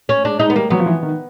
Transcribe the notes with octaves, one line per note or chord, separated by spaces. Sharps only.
C#4
G#3 D4
G#3 D#4
B3
G3 A#3
F#3 B3
F3
E3
D#3